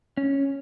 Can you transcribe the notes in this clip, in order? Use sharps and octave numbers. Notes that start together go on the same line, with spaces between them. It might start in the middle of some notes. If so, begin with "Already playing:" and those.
C#4